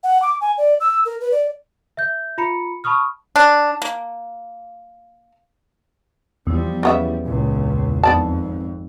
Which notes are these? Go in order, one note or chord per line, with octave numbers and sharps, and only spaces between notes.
F#5
D6
G#5
D5
E6
A#4
B4
D5
E5 G6
F4 A#5 B5 C#7
A5 B5 C#6 D#6 F6
D4
A#3
E2 F3 G3
C#3 B3 E5
C#2 A#2
G#1 F2 B3 D5 A5